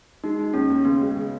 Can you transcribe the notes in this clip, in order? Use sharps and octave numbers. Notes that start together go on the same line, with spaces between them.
G#3 D#4
G#3
D#2 C#4
D#2
C#3 B3
G#3
C#3